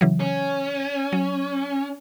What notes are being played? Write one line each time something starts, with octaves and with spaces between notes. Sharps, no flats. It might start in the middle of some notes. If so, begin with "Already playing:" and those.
C#3 E3 F#3
C#4
F#3